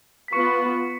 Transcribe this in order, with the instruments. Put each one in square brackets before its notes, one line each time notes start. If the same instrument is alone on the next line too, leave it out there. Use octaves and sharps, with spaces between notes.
[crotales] B6
[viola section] B3 F4 B4 [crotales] C#6 C#7